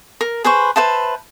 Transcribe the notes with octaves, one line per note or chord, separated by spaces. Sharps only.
A#4
G#4 B4 C5 C#6
B4 C5 E5 A5